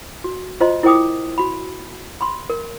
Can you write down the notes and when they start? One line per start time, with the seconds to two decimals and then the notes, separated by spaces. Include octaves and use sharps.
0.24 F#4
0.60 F4 C5 D#5 A#5 C6
0.83 E4 A#4 C5 G5 D6 D#6
1.38 F#4 B5
2.21 B5 C6
2.50 A#4